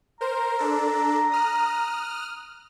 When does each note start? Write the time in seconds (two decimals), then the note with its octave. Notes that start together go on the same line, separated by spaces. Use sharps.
0.21 A#4 C5 A#5
0.58 D4 A4
1.31 D#6 F6 F#6